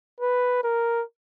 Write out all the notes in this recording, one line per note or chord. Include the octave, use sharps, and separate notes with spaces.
B4
A#4